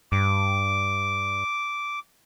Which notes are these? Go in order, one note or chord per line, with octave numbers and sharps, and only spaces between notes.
G2 D6